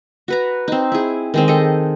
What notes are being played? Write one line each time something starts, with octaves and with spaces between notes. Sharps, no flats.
F#4 B4 A#5
C4 D#4
E4 G#4
D#3 G#3 C4
G#4 A4 D#5